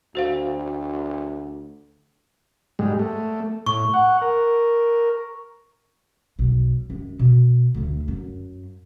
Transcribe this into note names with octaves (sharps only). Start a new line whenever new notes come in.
D2 F#4 C5 F5
G#2 G3 G#3
A3
A2 C#6
F#5
A#4
B1
F#2 G#3
B2
D2 D3
F#2